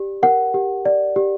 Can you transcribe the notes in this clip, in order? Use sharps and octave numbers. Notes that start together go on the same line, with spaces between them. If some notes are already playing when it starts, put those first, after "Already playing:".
Already playing: G4 D5
A#4 F#5
G4
D5
G4